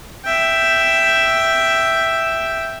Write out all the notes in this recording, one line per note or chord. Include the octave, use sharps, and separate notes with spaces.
E5 G5